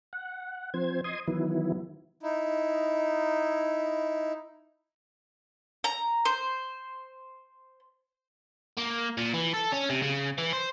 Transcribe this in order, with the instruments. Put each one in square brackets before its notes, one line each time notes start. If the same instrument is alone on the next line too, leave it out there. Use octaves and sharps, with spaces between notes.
[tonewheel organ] F#5
F3 C4 C5 G#6
D#5 C6 D#6 G#6
D#3 E3 F#3 B3 E4
[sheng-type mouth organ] D#4 E4
[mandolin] A#5
C5
[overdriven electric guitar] A#3
A#2
E3
A4
C#4
C3
C#3
E3
C5